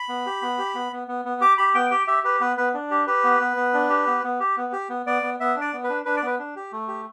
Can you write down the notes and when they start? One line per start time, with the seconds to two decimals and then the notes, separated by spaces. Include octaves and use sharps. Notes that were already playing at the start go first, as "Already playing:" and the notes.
Already playing: B5
0.09 B3
0.26 G4
0.42 B3
0.58 G4
0.75 B3
0.93 B3
1.08 B3
1.25 B3
1.41 G4 D6
1.58 G4 B5
1.75 B3 G5
1.91 G4 G5
2.07 G4 E5
2.24 G4 B4
2.40 B3 B4
2.57 B3 B4
2.74 D4
2.91 G4
3.07 G4 B4
3.24 B3
3.40 B3
3.57 B3
3.74 D4
3.90 G4
4.07 B3
4.24 B3
4.40 G4
4.57 B3
4.73 G4
4.89 B3
5.06 B3 D5
5.23 B3
5.40 B3 E5
5.56 D4
5.61 D5
5.73 B3
5.84 B4
5.89 D4
6.06 D4 B4
6.17 D5
6.23 B3 B4
6.39 D4
6.56 G4
6.72 A3
6.88 G4